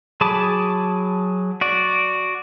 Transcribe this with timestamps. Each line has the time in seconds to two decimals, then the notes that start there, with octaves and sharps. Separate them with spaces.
0.21 F#3 G#4 A5 B5 D6
1.61 F#4 D5